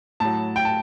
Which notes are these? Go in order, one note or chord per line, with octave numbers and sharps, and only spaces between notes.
A2 F#3 A5
G5
A5